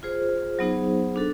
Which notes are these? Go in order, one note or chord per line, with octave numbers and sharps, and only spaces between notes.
F4 G#4 C5
F#3 B3 D#4 G#4 C5
D4 F#4 A4